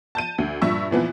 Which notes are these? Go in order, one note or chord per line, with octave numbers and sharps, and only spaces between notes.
A5 G6 D#7
D2
G2 A#2 E5 C#6
A#2 E3 F3 B3